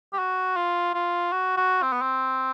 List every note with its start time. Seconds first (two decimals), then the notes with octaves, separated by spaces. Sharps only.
0.13 G4
0.19 F#4
0.56 F4
0.94 F4
1.32 F#4
1.57 F#4
1.82 C4
1.92 B3
2.02 C4